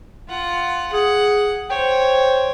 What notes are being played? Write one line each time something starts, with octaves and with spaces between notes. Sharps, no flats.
F4 F#5
G#4 F#5
C5 C#5 G5